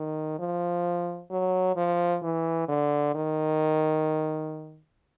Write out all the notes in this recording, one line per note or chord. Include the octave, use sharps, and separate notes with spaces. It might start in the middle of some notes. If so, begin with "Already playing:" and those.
Already playing: D#3
F3
F#3
F3
E3
D3
D#3